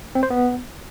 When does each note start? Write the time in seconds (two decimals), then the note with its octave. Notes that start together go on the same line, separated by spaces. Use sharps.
0.15 C4
0.23 C5
0.30 B3